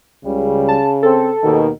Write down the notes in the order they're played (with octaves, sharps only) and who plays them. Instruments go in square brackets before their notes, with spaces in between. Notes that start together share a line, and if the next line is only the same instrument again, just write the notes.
[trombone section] C#2 G3 [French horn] C#3
[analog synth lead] A5
[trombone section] C4 [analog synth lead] A4
[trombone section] D#2 B2 [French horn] D#3